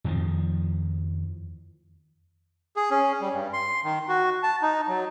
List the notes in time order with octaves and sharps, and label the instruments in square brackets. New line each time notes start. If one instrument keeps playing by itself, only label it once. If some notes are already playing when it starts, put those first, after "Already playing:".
[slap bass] F2 D#3 F3
[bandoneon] G#4
C#4
G3
G2
C6
D#3
F#4
A5
D#4
F#3